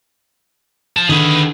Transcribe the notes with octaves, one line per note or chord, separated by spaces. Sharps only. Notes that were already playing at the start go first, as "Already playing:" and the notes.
F3 A5
D3 D#3 G#4 B4